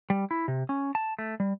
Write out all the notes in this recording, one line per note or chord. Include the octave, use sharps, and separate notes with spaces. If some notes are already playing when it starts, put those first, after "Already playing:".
G3
E4
C3
C#4
A5
A3
G3